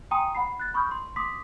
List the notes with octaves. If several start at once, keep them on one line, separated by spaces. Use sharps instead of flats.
G5 G#5 A#5 C6 D#6 D#7
F#5 B5 C7
F#6 A6
B5 C#6 D#6 F6 G6
C6
C6 D6 D#6 B6